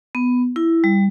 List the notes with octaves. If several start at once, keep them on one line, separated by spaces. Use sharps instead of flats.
B3
E4
G3